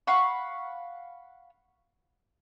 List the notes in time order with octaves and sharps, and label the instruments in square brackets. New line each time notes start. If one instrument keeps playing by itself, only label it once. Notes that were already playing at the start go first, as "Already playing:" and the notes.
[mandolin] F5 F#5 B5 C#6